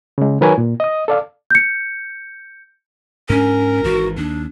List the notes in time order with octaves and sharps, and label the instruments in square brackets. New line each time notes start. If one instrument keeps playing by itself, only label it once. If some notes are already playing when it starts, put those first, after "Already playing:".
[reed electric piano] C#3 G#3
D#3 F#3 A#4 B4 C#5 G#5
A#2
D#5 D#6
A4 D5 F5
[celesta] G6 C#7
[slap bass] G#2 D4 [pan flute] C#4 [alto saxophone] A#4
[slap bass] G#1 G#2 E3 [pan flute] F#4
[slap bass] D#2 [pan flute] D4